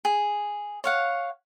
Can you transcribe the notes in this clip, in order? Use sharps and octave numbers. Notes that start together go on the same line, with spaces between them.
G#4
C#5 F5 F#5